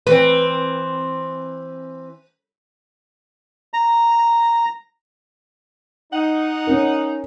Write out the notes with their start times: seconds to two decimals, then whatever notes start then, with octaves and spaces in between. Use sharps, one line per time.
0.07 E3 C4 B4
3.74 A#5
6.13 D#4 F#5
6.67 C#4 A#4